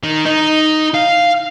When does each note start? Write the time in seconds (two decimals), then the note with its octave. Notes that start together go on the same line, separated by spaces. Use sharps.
0.04 D#3
0.26 D#4
0.94 F5